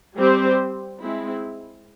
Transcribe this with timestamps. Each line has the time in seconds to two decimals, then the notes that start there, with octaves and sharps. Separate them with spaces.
0.17 G3 C4 G4 C5
1.01 G#3 C4 E4